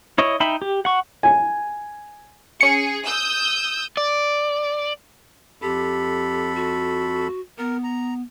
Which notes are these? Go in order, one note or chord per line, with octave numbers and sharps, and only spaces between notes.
E4 C#5 D#5
D#4 E5 G5 B5
G4
F#5 C#6
G#5
C#4 G#4 C#7
D#6 E6 G6
D5
F2 G4 A4 B5
F#4
B3 A#4
A#5